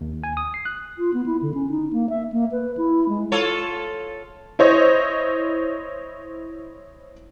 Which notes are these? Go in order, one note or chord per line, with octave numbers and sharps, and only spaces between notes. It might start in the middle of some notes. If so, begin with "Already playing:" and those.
D#2
G#5
D#6
C7
F#6
F4
B3
E4
D3
C#4
D#4
A#3
E5
A#3
B4
E4
G#3
F4 A4 C#5
E4 C5 C#5 D#5